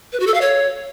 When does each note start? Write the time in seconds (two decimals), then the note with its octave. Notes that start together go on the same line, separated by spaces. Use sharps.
0.13 B4
0.20 F#4
0.27 A4
0.34 F5
0.41 C#5